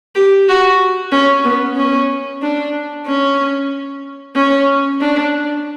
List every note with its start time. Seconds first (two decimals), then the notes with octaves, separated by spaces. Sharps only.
0.15 G4
0.48 F#4
1.12 C#4
1.44 B3
1.77 C#4
2.42 D4
3.07 C#4
4.36 C#4
5.01 D4